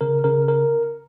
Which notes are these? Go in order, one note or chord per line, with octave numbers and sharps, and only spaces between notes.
C#3 A#4
C#3 A#4
A#4